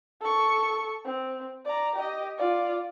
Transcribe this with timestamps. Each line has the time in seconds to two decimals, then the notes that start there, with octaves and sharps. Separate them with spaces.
0.21 A4 C#6
1.05 C4
1.65 D5 A#5
1.96 G4 D#5
2.38 F4 D5